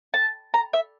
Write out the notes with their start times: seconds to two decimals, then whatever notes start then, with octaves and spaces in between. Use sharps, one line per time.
0.14 A5
0.54 A#5
0.73 E5